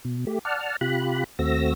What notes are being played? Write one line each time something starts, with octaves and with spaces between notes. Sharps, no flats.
B2
A3 G4
D5 F#5 A5 F6
C3 F4 G4 B5 F#6
D#2 A3 C4 F#4 E6 A#6